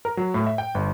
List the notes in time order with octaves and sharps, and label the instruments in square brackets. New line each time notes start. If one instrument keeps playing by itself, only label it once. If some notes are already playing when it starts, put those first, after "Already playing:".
[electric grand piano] A#4
F#3
A2
E5
G5
G1